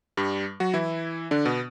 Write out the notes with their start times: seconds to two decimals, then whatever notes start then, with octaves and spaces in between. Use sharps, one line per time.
0.17 G2 G3
0.60 F#3 F#4
0.74 E3 E4
1.31 D3 D4
1.45 B2 B3